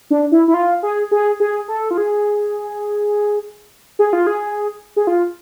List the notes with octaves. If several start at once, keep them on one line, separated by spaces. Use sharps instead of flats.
D4
E4
E4
F4
G#4
G#4
G#4
A4
F4
G#4
G#4
F4
G#4
G#4
F4